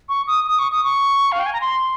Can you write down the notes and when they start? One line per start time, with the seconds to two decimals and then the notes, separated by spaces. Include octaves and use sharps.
0.09 C#6
0.27 D#6
0.47 D#6
0.59 C#6
0.72 D#6
0.84 C#6
1.32 F5
1.39 G5
1.46 G#5
1.53 A#5
1.61 C6